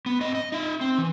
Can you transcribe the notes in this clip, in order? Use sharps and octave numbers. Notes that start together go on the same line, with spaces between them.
B3
C4 D#5
D#5
D#4 E5
C4
E3